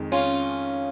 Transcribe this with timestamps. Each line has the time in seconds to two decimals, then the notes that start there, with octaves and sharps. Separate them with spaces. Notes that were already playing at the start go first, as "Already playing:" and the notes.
Already playing: F2 D#3 G#3
0.12 C#4 F4